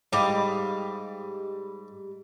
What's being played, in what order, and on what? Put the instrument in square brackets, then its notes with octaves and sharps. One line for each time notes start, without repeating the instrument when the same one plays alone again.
[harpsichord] G#2 D6 [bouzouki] G3 D#5 F5